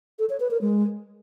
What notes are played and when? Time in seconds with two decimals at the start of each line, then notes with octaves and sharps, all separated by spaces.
0.19 A4
0.30 C#5
0.40 B4
0.51 A#4
0.61 G#3